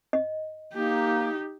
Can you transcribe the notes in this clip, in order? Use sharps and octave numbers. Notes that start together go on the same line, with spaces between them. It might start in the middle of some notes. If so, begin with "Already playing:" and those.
D#5
A#3 D#4 G4